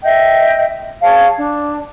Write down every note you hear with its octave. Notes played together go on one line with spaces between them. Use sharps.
D#5 E5 G5
G#4 C#5 F5 A5
D4